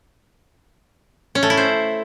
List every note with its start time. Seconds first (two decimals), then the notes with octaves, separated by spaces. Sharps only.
1.35 C#4
1.43 A3
1.50 E4
1.57 C5